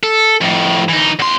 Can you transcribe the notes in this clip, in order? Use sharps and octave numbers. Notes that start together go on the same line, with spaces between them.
A4
F2 A2
E3 D#4
E2 C6